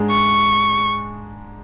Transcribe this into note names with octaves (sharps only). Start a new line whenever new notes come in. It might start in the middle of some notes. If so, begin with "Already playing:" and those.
Already playing: G#2 G#3 D4 G#4
C#6